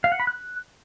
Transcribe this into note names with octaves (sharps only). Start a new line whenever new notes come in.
F5
F#5
B5
F#6